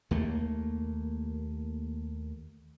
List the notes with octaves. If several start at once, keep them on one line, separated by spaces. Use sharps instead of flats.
D#2 A3 A#3